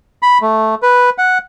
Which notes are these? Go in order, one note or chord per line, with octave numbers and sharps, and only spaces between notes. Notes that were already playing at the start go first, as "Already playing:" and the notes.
B5
A3
B4
F#5